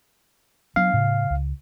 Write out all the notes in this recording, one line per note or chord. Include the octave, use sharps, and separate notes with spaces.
F#3 B3 D4 F5
A2 C#3
C#2